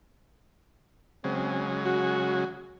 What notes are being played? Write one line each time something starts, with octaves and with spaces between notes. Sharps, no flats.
C#3 F#3 G#3 C4
F#4